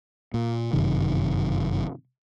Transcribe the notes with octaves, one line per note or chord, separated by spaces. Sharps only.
A#2
G1 F#2 C3 D#3